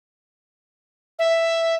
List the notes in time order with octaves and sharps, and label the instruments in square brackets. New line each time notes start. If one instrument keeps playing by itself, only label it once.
[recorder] E5